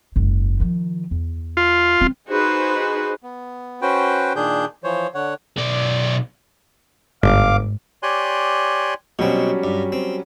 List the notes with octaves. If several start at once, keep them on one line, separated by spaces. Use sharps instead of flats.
F#1 G#2
D#3 F3
E2
F4
C4 C#4
D#4 F#4 G#4 B4 C5
B3
C#4 F#4 B4 C5 G5
A#2 D#3 D4 G#4 G6
E3 F3 C5 C#5
D3 C#5 F#5
B1 D5
G1 G#2 F5 D6
G4 C#5 D5 G#5 C6 F#6
B2 F#3 G3 C4 C#4
G2
C4